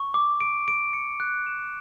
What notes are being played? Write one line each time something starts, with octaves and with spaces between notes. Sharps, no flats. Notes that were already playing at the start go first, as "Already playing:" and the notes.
Already playing: C#6
D6
D7
D7
C#7
F#6
E7